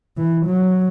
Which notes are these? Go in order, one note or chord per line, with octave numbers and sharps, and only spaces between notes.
E3
F#3